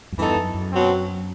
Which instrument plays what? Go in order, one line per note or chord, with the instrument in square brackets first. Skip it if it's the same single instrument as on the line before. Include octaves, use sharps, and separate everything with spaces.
[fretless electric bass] F#2
[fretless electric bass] E2 G2 [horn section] E3 B3 D#4 A4
[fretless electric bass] F#2
F#2
[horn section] B2 F#3 C4